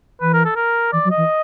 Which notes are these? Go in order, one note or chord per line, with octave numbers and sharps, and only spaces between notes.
E3 B4
A#4
A4
A#4
E3 D5
F#3
D#5
E3